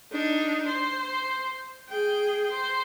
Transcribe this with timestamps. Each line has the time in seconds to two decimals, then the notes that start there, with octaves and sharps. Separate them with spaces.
0.12 D4 D#4
0.66 C5
1.89 G#4 G5
2.51 C5